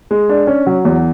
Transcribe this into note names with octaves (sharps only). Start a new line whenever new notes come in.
G#3
D4
C#4
F#3
E2